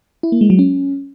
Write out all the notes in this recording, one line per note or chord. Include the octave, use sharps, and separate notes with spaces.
E4
A#3
G#3
F#3
C#4